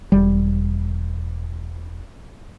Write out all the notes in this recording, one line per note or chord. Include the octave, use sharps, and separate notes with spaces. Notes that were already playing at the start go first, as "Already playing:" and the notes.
E1 G3